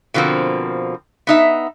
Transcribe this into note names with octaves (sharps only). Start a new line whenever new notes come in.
B2 D3 F3 A#3 C4
B3 D#4 E5